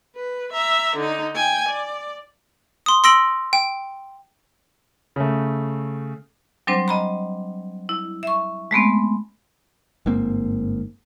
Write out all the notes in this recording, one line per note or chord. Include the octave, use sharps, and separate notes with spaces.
B4
E5 A#5
D3 D#4
G5 G#5
D5
C6 D#6
C6 E6 A#6 D7 F#7
G5
C#3 A3
F#3 G3 C4 D4 C5
D#5 A#5 B5
E4
E5 C#6
G#3 A3 B3 C4
G1 G#2 A#3 C4